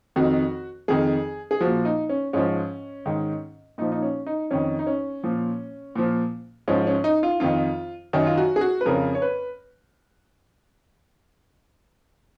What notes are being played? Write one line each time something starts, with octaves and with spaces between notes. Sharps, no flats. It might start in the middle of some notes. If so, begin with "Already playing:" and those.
F2 D#3 F#4
F2 D#3 G#4
G#4
A#2 F3 F#4
D#4
C#4
G#2 F3 C#4
G#2 D#3
A#2 F3 D#4
D#4
C#4
D#4
F2 D#3 C#4
D#4
C#4
A#2 F3
A#2 F3
G#2 F3 C#4
C#4
D#4
F4
F2 D#3 F4
F#2 D#3
F4
F#4
G#4
F#4
B4
F2 C#3 F3 A#4
C#5
B4